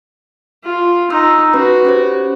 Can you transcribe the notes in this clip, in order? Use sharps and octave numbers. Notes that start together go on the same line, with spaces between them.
F4
D#4 C6 E6
C#4 F#4 B4 B5
C#4 G4 C5